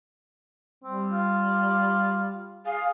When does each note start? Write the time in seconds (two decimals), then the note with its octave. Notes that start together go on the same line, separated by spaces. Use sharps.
0.84 G3 C4
1.12 F4
2.66 G#4 F5